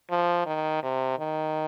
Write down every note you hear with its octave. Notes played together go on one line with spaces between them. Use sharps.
F3
D#3
C3
D#3